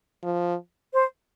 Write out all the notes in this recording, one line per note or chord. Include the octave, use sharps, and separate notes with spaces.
F3
C5